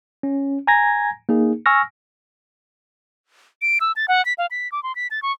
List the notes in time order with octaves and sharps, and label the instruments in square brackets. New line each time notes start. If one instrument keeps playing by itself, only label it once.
[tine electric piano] C#4
G#5 A#5 G#6 A#6
A#3 D#4 G#4
G#5 C#6 E6 F6 A#6
[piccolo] D7
E6
A6
F#5
B6
F5
B6
D6
C6
B6
A6
C#6